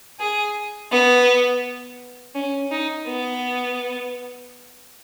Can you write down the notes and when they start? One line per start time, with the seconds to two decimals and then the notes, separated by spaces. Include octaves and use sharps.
0.20 G#4
0.92 B3
2.35 C#4
2.71 D#4
3.07 B3